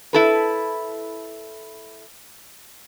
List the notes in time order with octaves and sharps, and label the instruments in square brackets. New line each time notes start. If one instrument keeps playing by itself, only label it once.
[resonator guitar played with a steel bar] E4 A4 B4